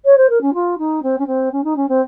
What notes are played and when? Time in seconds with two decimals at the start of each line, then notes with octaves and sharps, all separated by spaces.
0.05 C#5
0.17 C5
0.29 A#4
0.41 C#4
0.53 F4
0.78 D#4
1.02 C4
1.18 C#4
1.27 C4
1.52 C#4
1.64 D#4
1.76 C#4
1.88 C4